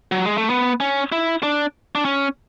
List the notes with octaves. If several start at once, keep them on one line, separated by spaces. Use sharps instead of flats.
F#3
G#3
A3
B3
C#4
E4
D4
D4
C#4